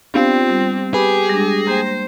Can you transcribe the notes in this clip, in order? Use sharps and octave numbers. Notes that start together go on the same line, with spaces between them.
B3 C4 D4 F4 G4
G3
G4 G#4 B4
G3 G#3 D4 A#6
A#3 C5 G5